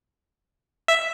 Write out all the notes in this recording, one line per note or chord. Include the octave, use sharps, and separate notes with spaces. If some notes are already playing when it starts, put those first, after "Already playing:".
E5